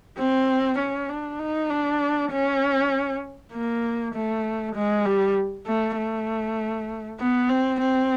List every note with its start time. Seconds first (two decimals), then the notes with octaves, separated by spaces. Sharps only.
0.18 C4
0.79 C#4
1.09 D4
1.40 D#4
1.70 D4
2.32 C#4
3.53 A#3
4.15 A3
4.76 G#3
5.06 G3
5.67 A3
5.98 A3
7.20 B3
7.50 C4
7.80 C4